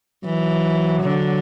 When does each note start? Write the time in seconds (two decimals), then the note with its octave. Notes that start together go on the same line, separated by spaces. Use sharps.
0.23 E3 F#3
1.03 D3